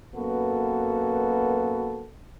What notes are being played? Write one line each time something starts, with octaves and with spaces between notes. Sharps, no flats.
F#2 A#3 B3 F#4 A4 B4